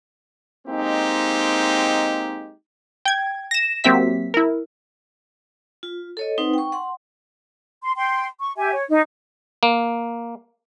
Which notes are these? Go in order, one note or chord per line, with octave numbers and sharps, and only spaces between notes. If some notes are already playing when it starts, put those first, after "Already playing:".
G#3 A#3 C4 D#4 G4
G5 G#6
A#6 E7
F#3 A#3 C4 G4 E5 B6
E4 A#4
F4
A4 C#5 D#5
C4 D#4 B4 C5 F#5
G5 C#6
F#5 C6
C6
G5 C6
C#6
G4 E5 G#5
C#5
D#4
A#3